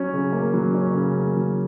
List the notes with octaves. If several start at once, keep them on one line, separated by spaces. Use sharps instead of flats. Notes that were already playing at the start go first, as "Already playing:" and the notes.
Already playing: F#3 C#4
C#3
A#3
F#3
C#4
C#3
A#3
F#3